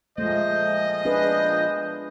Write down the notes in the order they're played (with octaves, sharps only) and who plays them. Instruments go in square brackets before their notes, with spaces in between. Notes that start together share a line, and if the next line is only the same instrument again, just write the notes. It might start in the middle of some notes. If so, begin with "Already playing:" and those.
[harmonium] A#2 F3 C5 [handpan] G#3 A3 [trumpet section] D#5
[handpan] D4 G#4 B4